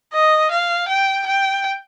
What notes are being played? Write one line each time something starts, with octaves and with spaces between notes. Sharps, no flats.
D#5
F5
G5
G5